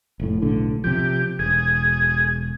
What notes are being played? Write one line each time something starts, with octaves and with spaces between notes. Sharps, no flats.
F1 A2
B1 A2 D3
C3 F3 G4
E1 G#4